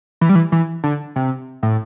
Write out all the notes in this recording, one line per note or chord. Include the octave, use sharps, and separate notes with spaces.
E3
G3
E3
E3
D3
C3
A2